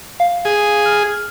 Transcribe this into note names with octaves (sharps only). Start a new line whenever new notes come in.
F5
G#4
F6